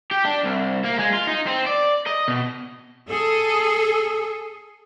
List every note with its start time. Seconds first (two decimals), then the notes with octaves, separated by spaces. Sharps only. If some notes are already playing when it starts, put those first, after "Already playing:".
0.11 G4
0.25 D4
0.44 C2
0.84 A#3
0.99 G#3
1.13 F4
1.27 D#4
1.47 C4
1.66 D5
2.07 D#5
2.28 B2
3.10 G#4 A4